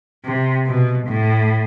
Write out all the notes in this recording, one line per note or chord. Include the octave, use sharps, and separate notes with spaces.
C3
B2
A2